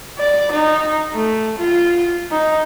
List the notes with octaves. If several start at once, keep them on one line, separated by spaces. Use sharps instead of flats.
D5
D#4
A3
F4
D#4